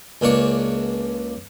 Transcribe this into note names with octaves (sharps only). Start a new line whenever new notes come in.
C#2 A#3 D4 C#6